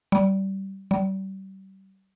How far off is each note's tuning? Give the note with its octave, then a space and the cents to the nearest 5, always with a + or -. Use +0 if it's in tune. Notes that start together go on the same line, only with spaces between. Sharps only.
G3 -20
G3 -35